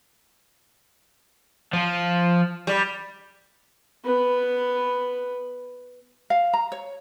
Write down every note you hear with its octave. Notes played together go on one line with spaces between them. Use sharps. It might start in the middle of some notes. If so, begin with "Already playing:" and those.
F3
G3
B3 B4
F5
A#5
C#5